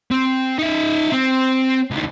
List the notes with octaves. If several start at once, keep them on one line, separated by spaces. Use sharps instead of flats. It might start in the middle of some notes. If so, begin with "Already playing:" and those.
C4
D#4 E5
C4
C#2 D#3